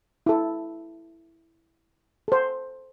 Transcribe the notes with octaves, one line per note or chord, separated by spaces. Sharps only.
E4 A4
A4 C5